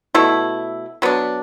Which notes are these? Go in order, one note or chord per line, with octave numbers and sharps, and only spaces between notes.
B2 A3 E4
F#3 B3 D4